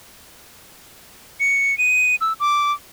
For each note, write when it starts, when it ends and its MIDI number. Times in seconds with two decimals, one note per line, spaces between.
1.40 1.77 97
1.78 2.15 99
2.21 2.33 88
2.40 2.72 86